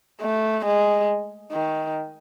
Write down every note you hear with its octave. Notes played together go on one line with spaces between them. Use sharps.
A3
G#3
D#3